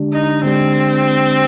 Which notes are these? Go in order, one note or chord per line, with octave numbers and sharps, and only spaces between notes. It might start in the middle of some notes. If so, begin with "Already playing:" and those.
Already playing: D3 G#3 D4 G4 D5
D#4
D3 G#3 C4 D4 G4 D5